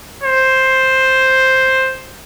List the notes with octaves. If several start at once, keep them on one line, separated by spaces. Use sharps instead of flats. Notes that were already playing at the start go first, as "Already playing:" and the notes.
C5